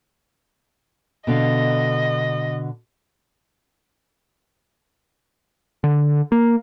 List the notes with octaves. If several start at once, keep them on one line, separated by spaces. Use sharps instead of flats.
B2 D3 D#5 F5
D3
A#3